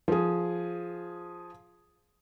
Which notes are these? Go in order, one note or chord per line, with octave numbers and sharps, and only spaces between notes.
F3 G#4